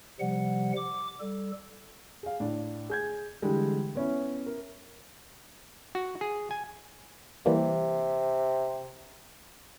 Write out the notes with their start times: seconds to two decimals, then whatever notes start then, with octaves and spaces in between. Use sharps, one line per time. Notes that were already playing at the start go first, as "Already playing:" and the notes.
0.20 C3 F3 G3 F#5
0.76 D6
1.20 G3 A4
2.23 G#4 F5
2.40 A2 D4
2.90 G#4 G6 G#6
3.42 D3 E3 G3 G#3
3.95 B3 C#4 E4
4.46 A#4
5.95 F#4
6.21 G#4
6.51 G#5
7.46 C3 E3 G3 A#3